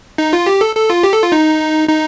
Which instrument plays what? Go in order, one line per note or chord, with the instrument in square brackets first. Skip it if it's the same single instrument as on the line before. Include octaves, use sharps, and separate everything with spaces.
[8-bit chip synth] D#4
F4
G4
A4
A4
F4
G4
A4
F4
D#4
D#4